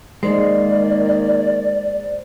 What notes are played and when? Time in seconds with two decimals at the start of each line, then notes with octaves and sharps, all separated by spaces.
0.23 D#3 G#3 A#3 C5 D5